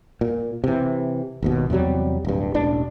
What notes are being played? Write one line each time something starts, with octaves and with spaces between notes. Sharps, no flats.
A#2
C3 E3
G#1 D#2 B2
E2 C3 F#3 G3
D1 G2
E1 A1 D4